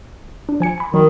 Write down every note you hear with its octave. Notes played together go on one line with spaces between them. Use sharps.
D4
F3 G#5 C#7
G#5 B5
D#3 F#3